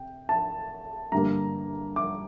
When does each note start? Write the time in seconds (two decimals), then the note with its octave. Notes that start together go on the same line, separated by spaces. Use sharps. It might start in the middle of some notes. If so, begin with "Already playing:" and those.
Already playing: C3 G5
0.29 A5
1.12 G2 D3 G3 A#3 A#5
1.96 D6